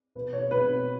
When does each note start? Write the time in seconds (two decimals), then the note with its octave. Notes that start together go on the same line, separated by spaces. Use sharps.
0.15 B2 B4
0.33 C#5
0.51 B2 B4